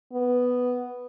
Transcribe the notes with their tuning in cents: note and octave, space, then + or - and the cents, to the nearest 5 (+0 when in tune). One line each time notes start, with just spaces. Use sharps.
B3 +0